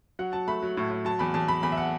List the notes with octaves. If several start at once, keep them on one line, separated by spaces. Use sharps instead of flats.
F#3 F#5
F#3 A5
A3 B5
F#3
A2
A2
F#3 A5
E2 B5
E2 A5
E2 B5
E2 B5
E5
F#5